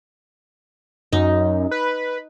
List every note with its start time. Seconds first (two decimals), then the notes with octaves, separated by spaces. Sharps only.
1.13 F#2 D#4
1.71 B4